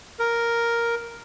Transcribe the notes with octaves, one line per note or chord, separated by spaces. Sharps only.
A#4